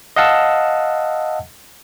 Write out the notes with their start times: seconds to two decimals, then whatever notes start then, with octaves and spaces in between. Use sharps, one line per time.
0.16 D#5 F5 F#5 A5 E6